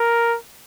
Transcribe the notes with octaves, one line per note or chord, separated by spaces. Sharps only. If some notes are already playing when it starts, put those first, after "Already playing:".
Already playing: A#4